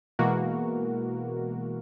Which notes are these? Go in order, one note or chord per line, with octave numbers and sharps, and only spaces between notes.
B2 E3 G#3 A#3 F#4 A#4